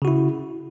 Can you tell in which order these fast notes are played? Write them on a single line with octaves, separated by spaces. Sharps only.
C#3 F#4 E4